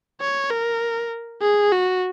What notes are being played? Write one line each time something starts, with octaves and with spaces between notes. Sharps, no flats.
C#5
A#4
G#4
F#4